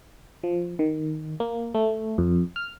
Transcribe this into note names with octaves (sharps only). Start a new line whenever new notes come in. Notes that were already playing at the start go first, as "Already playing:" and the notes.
F3
D#3
A#3
A3
F2
F6